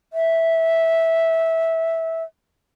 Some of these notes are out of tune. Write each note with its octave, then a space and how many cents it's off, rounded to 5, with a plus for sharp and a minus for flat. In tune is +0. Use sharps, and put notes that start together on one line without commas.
E5 -10